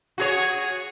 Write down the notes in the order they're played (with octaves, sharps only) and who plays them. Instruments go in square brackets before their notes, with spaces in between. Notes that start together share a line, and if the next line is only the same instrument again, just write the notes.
[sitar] F#4 G#4 C#5